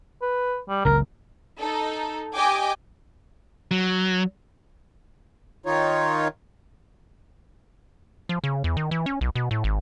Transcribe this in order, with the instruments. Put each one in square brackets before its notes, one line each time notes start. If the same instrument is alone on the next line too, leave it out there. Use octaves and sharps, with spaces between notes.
[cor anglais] B4
G3
[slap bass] F#1 C#2 [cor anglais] A#4
[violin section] D#4 A4
G4 D#5 G5 G#5 D6
[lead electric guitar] F#3
[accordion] D#3 D#4 F4 C#5
[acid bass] F3
C#3
E2
D#3
E3
C#4
B1
B2
A2
G#1